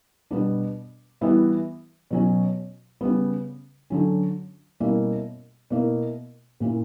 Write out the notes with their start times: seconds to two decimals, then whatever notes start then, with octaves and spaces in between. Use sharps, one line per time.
0.31 B2 G3 B3 D4
1.21 E3 G3 B3 E4
2.11 B2 F#3 C#4
3.01 C#3 G3 B3
3.90 D3 F#3 C#4
4.80 B2 G3 A#3 C#4 E4
5.70 B2 A#3 E4
6.60 A#2 A#3 C#4 E4